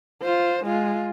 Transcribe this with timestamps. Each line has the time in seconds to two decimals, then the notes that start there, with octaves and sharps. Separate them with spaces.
0.22 F4 C5
0.65 G#3 F4